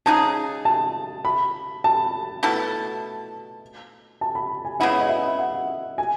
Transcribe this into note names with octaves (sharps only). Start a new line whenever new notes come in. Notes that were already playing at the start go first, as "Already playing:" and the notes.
C#3 G#3 D#4 G#4 A5
A5
B5
A5
B2 A3 E4 A4
A5
B5
G#5
C#3 G#3 B3 E4 F#5
D#5
E5
F#5
G#5